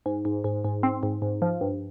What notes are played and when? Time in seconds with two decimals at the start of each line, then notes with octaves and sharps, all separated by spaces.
0.06 G#2
0.25 G#2
0.44 G#2
0.64 G#2
0.83 C4
1.03 G#2
1.22 G#2
1.42 F3
1.61 G2